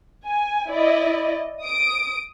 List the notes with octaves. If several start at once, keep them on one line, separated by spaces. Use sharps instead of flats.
G#5
E4 D5 D#5
D#6 D7